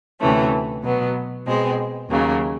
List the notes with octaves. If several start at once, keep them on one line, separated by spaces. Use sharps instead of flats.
D2 C3 E3 A3 C#4
B2 F#3 B3
B2 G#3 C4
D#2 C#3 F#3 A#3